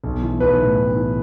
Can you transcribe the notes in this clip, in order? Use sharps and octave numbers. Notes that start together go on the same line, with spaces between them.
B1
E3
B1 B4
A2
B1
E3